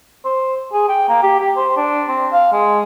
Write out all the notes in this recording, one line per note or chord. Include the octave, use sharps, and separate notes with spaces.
C5
G#4
G5
A#3
G4
G4
C5
D4
C4
F5
G#3